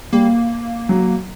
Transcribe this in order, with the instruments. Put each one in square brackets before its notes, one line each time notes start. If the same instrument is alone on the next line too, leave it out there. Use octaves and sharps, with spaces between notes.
[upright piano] G3 [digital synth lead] A#3
[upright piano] F#3